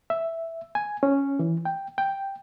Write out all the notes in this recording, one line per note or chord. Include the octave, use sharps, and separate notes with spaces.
E5
G#5
C#4
E3
G5
G5